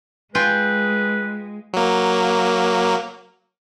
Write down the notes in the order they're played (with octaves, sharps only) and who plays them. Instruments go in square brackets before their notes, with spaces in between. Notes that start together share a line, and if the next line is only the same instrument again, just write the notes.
[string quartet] G#3 [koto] F4 G5 G#5 [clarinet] B4
[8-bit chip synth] F#3 A#3